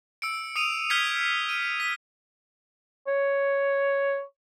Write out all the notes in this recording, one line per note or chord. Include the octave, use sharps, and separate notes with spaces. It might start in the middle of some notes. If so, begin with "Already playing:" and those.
E6 C#7 D7
D#6 C#7 D#7 F7
F6 G6 G#6 B6 C#7
D#7
B6
C#5